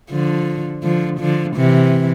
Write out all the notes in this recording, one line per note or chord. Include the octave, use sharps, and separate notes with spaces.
D3 F3
D3 F3
D3 F3
C3 E3